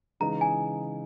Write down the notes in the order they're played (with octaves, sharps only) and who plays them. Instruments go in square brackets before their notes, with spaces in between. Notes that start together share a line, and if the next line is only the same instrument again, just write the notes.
[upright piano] C#3 E3 G#3 D#4 [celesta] A#5
[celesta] G#5